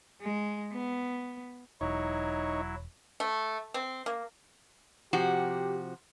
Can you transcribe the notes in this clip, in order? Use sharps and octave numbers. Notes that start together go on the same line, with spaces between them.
G#3
B3
E1 F#3 D#4 E4 C#5
A3
C4
A#3
C3 F3 F#4 G4